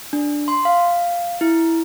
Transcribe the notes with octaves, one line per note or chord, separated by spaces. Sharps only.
D4
C6
F5
E4